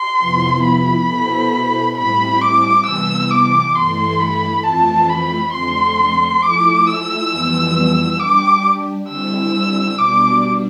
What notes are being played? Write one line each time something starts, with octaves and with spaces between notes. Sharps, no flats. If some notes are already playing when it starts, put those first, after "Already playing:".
Already playing: C6
F2 C3 F3 B3 E4
B5
B2 B3 E4 A4 C5
A2 G3 C4 E4 B5
D6
C3 E3 G3 B3 E6
D6
G2 E3 A3 E4 A4 C6
B5
F2 E3 A3 C4 F4 A5
B5
F2 D3 A3 C4 C6
F3 A3 E4 D6
E6
F2 E3 G3 B3
G3 D4 G4 D6
D3 G3 C4 E4 E6
B2 G3 D4 D6